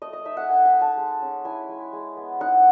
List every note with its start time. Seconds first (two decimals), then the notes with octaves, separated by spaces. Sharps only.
0.02 A3 D#5
0.13 D#5
0.25 D#4 E5
0.37 F#5
0.49 A3 G#5
0.65 G#5
0.73 D#4
0.81 A5
0.97 G#3
1.21 C#4
1.45 E4 G#5
1.69 G#3
1.93 G#3
2.17 B3
2.41 D#4 F#5